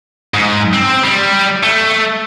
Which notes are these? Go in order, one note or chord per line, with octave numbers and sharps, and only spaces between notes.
G#2
C4
G3
A3